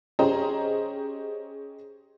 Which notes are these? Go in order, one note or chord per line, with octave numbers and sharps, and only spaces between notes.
C#4 G4 G#4 C5 D#5 A#5